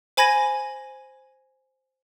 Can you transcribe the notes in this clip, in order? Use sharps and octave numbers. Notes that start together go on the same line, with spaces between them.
C5 G#5 B5 G#6 A#6 D#7